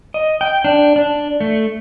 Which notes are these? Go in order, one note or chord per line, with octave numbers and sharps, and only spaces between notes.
D#5
G5
D4
D4
A3